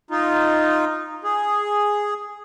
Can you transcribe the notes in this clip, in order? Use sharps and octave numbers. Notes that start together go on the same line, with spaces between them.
D#4 F4
G#4